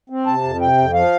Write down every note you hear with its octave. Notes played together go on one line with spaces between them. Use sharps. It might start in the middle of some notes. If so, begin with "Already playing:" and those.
C4
C3 A5
F2
C3 G5
F2
F3 F5